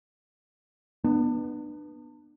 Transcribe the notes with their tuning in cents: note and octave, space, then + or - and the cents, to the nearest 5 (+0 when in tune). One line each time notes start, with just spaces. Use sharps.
B3 -15 D4 +35